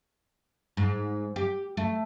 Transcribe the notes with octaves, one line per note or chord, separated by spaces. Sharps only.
G#2
G4
A3